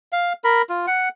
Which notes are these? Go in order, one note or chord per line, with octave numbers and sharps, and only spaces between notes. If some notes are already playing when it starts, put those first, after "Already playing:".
F5
A#4 B5
F4
F#5